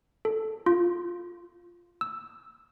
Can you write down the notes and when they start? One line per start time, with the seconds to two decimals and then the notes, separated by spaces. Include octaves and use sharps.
0.25 A4
0.66 F4
2.01 E6